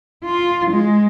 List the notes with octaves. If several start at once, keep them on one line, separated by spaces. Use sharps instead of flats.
F4
G#3